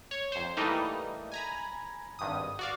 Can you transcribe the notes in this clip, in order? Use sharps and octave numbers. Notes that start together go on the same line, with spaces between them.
C#5
F2 C5
E3 G3 A3 A#3 D#4
G#5 A#5 B5
G#1 G2 D#6
F#4 D5 F5